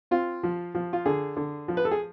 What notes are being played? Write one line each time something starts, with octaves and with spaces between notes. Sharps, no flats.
C4 F4
F3
F3
F4
D3 G#4
D3
F3
B4
A4
G#4